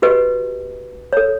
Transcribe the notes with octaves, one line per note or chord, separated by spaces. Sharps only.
F#4 G4 B4 D#5
A4 C#5